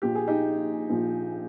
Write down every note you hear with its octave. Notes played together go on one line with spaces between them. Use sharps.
A#1 A#2 F3 G4
G#4
D#4 G4
A#1 A#2 F3